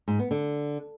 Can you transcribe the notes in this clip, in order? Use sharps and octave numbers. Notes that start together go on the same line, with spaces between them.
G#2
B3
D3